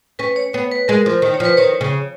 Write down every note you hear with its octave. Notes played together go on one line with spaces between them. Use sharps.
C#4 B4
C#5
B3 C#5
B4
G#3 A#4
F3
D#3
C#5
F3
B4
D#3 C#5
C#3